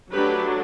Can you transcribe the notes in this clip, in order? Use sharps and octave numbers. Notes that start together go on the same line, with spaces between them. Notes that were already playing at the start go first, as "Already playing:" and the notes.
F#3 A3 D4 G4 B4